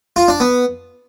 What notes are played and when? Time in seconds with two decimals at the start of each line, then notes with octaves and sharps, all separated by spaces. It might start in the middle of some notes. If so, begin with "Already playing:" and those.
0.16 F4
0.28 D4
0.40 B3